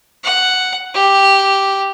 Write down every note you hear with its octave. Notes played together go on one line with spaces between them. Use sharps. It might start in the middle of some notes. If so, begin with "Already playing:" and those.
F#5
G4